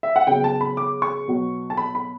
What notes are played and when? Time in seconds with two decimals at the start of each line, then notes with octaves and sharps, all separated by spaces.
0.03 E5
0.16 F#5
0.27 C#3 F#3 B3 G5
0.44 A5
0.61 B5
0.77 D6
1.02 C#6
1.28 B2 F#3 B3
1.70 A5
1.77 B5
1.95 B5